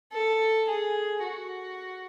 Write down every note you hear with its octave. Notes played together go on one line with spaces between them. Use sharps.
A4
G#4
F#4